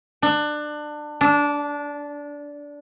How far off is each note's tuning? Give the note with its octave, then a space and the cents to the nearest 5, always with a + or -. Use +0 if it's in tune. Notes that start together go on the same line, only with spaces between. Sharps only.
D4 +25
D4 -15